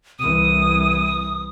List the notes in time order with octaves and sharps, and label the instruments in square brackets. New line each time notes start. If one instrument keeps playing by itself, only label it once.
[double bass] C2 E3 [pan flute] D#6 [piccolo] D#7